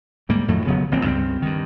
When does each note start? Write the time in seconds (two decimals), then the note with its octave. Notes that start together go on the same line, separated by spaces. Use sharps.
0.29 D2 G#2 G3 A#3
0.48 F2 A2 D#3 F#3
0.67 D#1 C#3 F#3 B3
0.92 A1 A#2 C4
1.04 C#2 G2 A#3 C4
1.42 G2 D#3